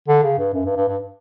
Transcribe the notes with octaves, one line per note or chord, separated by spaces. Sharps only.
D3
C#3
G2
F#2
G2
G2
G2